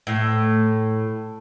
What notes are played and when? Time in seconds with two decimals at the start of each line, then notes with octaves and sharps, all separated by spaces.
0.07 A2